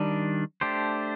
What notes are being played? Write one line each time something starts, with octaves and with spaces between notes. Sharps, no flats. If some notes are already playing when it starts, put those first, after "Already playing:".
Already playing: D#3 G3 D4
A3 D4 G4 C5